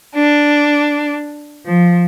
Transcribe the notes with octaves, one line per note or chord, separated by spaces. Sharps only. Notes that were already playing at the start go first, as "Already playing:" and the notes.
D4
F3